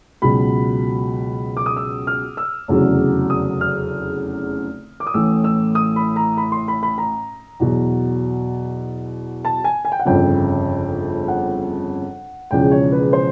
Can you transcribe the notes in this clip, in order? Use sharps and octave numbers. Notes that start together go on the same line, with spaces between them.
C#2 B2 F#3 B5
D6
D#6
E6
F6
E6
F1 E2 C#3 F#3
D#6
F6
D6
D#6
A1 A2 E3 E6
E6
D#6
B5
A#5
B5
C6
B5
B5
A#5
E2 B2 F#3
A5
G#5
G#5
G5
F#5
G1 F2 C#3 G5
F#5
E1 E2 C#3 F3 G5
C#5
B4
C5